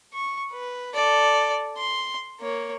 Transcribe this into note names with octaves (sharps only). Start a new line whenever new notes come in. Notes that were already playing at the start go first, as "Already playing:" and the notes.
C#6
B4
A4 D5
C6
A#3 C#5